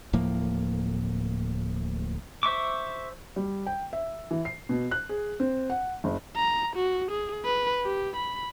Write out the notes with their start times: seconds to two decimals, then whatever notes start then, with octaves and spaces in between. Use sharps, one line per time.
0.13 D1 A2 F3 A#3
2.43 C5 E5 C#6 D6
3.36 G3
3.67 G5
3.93 E5
4.31 E3
4.45 C7
4.69 B2
4.91 F#6
5.09 G#4
5.40 C4
5.70 F#5
6.04 F#1
6.36 A#5
6.76 F#4
7.11 G#4
7.45 B4
7.84 G4
8.16 B5